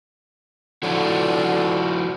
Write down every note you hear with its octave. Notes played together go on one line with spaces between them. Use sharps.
D3 F3 E4 F#4